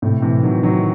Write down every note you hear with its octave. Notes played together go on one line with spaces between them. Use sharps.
A2 C3
C3 E3
D#3 F#3
D#3 F#3